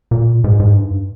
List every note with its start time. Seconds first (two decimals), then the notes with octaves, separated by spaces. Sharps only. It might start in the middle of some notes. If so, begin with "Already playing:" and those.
0.11 A#2
0.44 G#2
0.60 G#2
0.76 G2